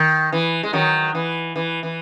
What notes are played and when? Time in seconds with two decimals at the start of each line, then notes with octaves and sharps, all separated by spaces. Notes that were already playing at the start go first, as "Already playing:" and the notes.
Already playing: D#3
0.33 E3
0.63 G#3
0.73 D#3 F#3
1.15 E3
1.56 E3
1.83 E3